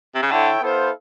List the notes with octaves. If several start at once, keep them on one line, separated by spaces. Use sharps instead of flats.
C3
C#3
D3 E4 A4 C#5 E5 G5
B3 E4 A4 C5 F5